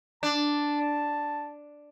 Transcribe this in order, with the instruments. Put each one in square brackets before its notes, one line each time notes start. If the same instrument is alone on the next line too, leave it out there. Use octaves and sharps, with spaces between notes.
[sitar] D4 [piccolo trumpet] A5